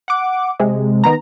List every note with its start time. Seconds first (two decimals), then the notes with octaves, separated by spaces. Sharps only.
0.08 F#5 D6
0.60 C3 G#3
1.04 D#3 B3 A#5